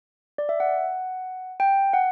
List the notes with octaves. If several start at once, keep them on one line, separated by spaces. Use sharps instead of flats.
D5
E5
F#5
G5
F#5